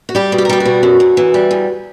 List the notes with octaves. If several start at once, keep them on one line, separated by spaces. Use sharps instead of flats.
F#4
G3 G4
B2
G4
A#4
G3 G4
F#4
B2
F#2
F#2
E3
G3
E2